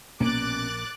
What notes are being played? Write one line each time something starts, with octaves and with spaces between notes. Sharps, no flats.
A#1 B2 A#3 C#4 D6 F#6 A6